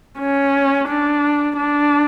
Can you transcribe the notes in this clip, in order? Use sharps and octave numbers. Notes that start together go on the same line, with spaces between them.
C#4
D4
D4